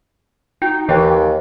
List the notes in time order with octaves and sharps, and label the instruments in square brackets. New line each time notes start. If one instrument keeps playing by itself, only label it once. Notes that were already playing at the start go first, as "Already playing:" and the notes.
[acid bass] D#4 [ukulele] F#4 G5
[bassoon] D#2 [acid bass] E3 [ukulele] F5 G5